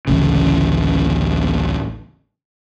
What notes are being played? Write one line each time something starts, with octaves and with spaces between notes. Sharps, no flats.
A1 D2 C#3